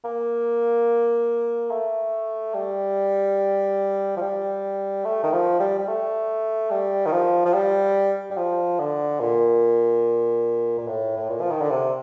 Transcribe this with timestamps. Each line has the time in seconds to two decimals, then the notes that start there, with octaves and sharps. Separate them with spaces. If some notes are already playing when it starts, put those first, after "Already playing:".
0.04 A#3
1.71 A3
2.54 G3
4.17 F3
4.21 G3
5.05 A3
5.24 D#3
5.32 F3
5.60 G3
5.79 G3
5.88 A3
6.71 G3
7.06 D#3
7.12 F3
7.45 F3
7.54 G3
8.31 G3
8.37 F3
8.79 D3
9.20 A#2
10.78 A#2
10.87 A2
11.17 A2
11.29 A#2
11.41 F3
11.50 D#3
11.61 D3
11.71 C3